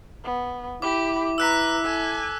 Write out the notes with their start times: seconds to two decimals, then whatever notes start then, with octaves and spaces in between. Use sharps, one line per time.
0.24 B3
0.82 E4 G4 B5 D6
1.38 B4 A#5 E6 F#6 B6
1.83 A4 G#5